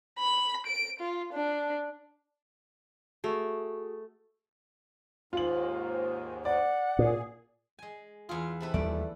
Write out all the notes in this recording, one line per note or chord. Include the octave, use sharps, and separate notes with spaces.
B5
D7
F4
D4
A3 F#4 G#4
D#2 G#2 F4 F5 F#7
D5 F#5
A#2 G#4
G#3 G#5
E2 F4 G#4
C3 E4 A4 B4
D#2 G3 A3 D5